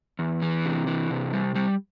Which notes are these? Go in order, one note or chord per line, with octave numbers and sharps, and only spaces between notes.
E2
E3
C3
E3
C3
G3
G3